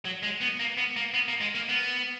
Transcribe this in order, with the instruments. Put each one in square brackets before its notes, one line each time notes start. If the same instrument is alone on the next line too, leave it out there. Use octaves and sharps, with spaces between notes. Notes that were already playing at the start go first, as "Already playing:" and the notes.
[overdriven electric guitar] F#3
G#3
B3
A#3
B3
A#3
B3
A#3
G#3
A#3
B3